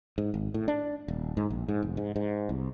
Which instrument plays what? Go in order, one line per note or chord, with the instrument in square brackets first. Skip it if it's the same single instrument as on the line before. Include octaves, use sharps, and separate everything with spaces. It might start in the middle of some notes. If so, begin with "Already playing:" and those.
[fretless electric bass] G#2
G#1
A2
D4
D#1
G#2
A#1
G#2
F1
G#2
G#2
C2